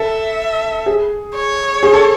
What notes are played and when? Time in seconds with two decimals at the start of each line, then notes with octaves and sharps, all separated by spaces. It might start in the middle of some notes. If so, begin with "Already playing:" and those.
Already playing: A4 E5
0.86 G#4
1.35 C#5
1.83 G#4
1.94 A4